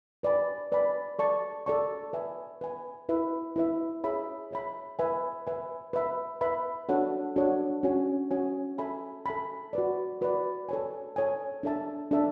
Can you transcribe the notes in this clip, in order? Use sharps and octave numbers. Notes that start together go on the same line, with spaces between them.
B4 D5 G#5 B5
B4 D5 G#5 B5
A4 D5 A5 C#6
A4 D5 A5 C#6
B4 E5 G#5
B4 E5 G#5
E4 B4 E5
E4 B4 E5
G#4 C#5 E5 B5
G#4 C#5 E5 B5
B4 E5 G#5
B4 E5 G#5
B4 E5 B5
B4 E5 B5
D4 F#4 A4 C#5 F#5
D4 F#4 A4 C#5 F#5
C#4 F#4 C#5 G#5
C#4 F#4 C#5 G#5
A4 E5 G#5 B5
A4 E5 G#5 B5
F#4 B4 D5
F#4 B4 D5
A4 C#5 G#5
A4 C#5 G#5
D4 A4 E5 A5
D4 A4 E5 A5